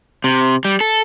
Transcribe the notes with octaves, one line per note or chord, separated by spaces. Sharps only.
C3
G3
A4